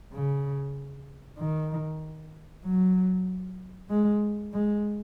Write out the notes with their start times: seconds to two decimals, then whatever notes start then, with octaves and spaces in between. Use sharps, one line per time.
0.13 C#3
1.39 D#3
2.65 F#3
3.90 G#3
4.53 G#3